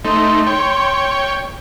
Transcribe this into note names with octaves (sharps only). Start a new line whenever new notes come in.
A3 D#4 C6
C#5 G5